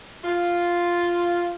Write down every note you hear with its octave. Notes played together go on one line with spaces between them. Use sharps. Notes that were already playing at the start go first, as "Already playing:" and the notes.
F4